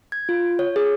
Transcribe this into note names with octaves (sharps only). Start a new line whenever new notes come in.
G#6
F4
C#5
G#4